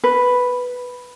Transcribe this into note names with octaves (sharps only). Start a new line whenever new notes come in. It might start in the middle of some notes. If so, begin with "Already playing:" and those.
B4